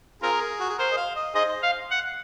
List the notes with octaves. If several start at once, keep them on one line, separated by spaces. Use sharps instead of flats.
C4 F4 G#4 A#4
F#4
G#4
A#4 C5
D#5
F5
D#5
D#4 G#4 C5 D#5
F5
F#5